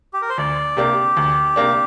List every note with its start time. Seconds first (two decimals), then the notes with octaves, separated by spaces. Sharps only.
0.13 G4
0.22 A#4
0.29 C5
0.38 D2 D5
0.77 C3 A#3 D4 G4
1.17 D2
1.56 C3 A#3 D4